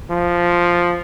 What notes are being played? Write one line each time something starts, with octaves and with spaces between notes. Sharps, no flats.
F3